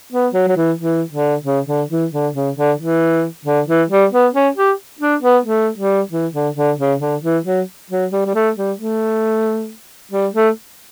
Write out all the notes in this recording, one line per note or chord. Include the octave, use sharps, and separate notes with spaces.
B3
F#3
F#3
E3
E3
D3
C#3
D3
E3
D3
C#3
D3
E3
D3
E3
G3
B3
C#4
G4
D4
B3
A3
G3
E3
D3
D3
C#3
D3
E3
F#3
F#3
G3
G3
A3
G3
A3
G3
A3